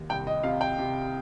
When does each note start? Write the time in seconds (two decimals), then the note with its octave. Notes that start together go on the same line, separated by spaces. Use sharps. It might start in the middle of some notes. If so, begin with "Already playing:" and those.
Already playing: D#2
0.09 C2 G5
0.27 D#5
0.43 C3 F5
0.61 G5
0.79 C3